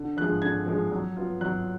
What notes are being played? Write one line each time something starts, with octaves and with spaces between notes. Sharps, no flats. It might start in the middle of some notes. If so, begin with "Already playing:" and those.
Already playing: D3
F3 G#3 F#6
D3 G#6
F3 G#3
F#3
B3 F4
F#3 F#6